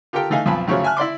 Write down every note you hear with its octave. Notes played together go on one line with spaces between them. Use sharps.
F4 G4 A4 A#4 G5
E3 A3 D#4 F5 G#5
B1 F2 F4 G#5 A5 B5
F#2 C#3 F3 F#3 A3 C#5
E5 G#5 A5 F6 F#6
E4 D5 C6 D6